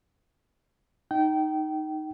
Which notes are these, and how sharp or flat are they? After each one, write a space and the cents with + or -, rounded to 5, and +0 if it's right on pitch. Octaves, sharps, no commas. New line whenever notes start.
D#4 +0 G5 -25